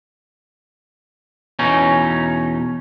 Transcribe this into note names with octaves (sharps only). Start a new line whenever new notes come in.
E2 B2 C#4 D#4